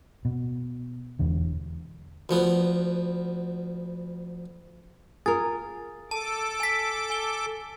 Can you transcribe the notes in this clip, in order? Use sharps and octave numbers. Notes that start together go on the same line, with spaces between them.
B2
E1 E2 D3
D2 F3 B3
F4 G#4 A#4 A6
A4 A5 D6
G#5 B6
G#5 G7